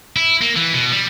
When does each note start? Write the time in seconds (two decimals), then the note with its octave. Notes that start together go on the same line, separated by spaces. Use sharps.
0.16 E4
0.41 A#3
0.56 E3
0.73 B2
0.92 G3